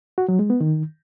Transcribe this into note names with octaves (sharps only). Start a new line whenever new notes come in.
F#4
F#3
G#3
B3
D#3